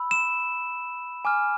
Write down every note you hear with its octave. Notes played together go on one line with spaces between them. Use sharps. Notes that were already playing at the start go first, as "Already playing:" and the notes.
Already playing: B5 E6
E7
G#5 D6 F6